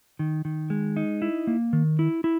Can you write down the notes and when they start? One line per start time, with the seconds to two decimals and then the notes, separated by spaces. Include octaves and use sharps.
0.19 D#3
0.45 D#3
0.70 G#3
0.97 D#4
1.22 E4
1.47 A#3
1.73 D#3
1.99 E4
2.24 E4